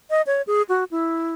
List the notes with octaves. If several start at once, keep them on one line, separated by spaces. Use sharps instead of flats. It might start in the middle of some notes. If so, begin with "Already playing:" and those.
D#5
C#5
G#4
F#4
E4